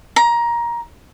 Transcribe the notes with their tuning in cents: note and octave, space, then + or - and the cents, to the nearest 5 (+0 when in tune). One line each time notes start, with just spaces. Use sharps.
A#5 +20